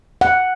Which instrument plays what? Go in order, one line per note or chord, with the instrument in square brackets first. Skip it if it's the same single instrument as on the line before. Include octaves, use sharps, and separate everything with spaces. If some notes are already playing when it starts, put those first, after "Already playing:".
[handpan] F#5